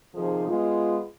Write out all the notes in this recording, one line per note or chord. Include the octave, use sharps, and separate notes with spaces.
C3 D#3 F3 D#4 G#4
G#3 B3 F4